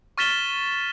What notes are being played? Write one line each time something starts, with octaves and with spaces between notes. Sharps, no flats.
C#6 F6 A6 B6 E7 G7